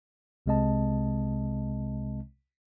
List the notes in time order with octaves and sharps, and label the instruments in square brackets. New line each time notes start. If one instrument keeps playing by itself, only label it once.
[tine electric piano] C2 C3 G#3 C4 D#5 A5